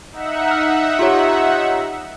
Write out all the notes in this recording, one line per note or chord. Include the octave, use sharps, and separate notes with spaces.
D#4 E5 F#5
F6
F4 G4 C#5